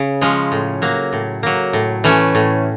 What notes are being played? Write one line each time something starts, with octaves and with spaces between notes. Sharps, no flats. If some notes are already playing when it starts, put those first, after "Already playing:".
Already playing: C#3
F3 G#3 C#4
A2
F#3 A#3
A2
F#3 A#3
A2
E3 A3 C#4
A2